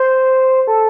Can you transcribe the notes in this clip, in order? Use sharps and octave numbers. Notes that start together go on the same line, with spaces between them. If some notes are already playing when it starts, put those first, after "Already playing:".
Already playing: C5
A4